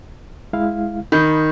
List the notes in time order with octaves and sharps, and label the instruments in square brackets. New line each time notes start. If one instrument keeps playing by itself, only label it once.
[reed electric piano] G#3 E4 F5
[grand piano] D#3 [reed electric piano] B5 G6